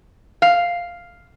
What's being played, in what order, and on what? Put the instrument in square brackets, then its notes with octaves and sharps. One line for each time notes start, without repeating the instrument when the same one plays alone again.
[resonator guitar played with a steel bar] F5